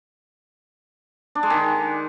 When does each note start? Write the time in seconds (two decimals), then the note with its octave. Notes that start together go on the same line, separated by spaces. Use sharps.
1.35 D4
1.43 G#3
1.50 D#3